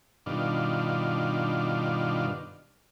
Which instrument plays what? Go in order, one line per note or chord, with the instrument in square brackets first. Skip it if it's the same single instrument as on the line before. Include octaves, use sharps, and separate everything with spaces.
[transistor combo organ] G2 B2 D#3 D4 F4